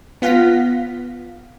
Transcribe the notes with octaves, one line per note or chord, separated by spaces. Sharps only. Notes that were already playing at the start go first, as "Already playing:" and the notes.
B3 F4 F5 F#5 A#6 B6